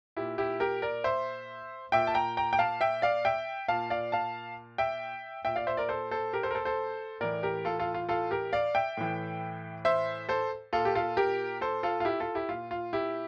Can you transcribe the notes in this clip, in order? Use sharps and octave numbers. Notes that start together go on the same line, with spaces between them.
A#2 E4 G4
E4 G4
G4 A#4
A#4 D5
C5 E5
A#2 E5 G5
A5
G5 A#5
G5 A#5
G5
F5 A5
E5 G5
D5 F5
E5 G5
A#2 F5 A5
D5 F5
F5 A5
E5 G5
A#2 E5 G5
D5 F5
C5 E5
A#4 D5
A4 C5
A4 C5
G4 A#4
A4 C5
A#4
A4 C5
A4 C5
A2 E3 A#4 D5
G4 A#4
F4 A4
F4 A4
F4
F4 A4
G4 A#4
D5 F5
E5 G5
A2 E3
C5 E5
A4 C5
A#2 F4 A4
G4
F4 A4
G4 A#4
A4 C5
F4 A4
F4
E4 G4
F4 A4
E4 G4
A#2 F4
F4
E4 G4